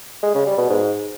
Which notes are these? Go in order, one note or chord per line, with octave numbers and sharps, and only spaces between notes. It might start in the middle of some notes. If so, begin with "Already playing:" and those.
G#3
C#3
G3
B2
G#2